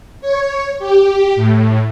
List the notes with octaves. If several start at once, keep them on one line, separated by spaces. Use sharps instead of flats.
C#5
G4
A2